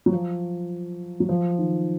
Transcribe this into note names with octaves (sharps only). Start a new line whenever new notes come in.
F#3
F3
F#3
F3
D#3